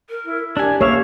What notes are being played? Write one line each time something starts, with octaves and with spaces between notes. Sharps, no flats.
A#4
E4
D4 G4 G#5
A#3 C#5 E5 F5 C#6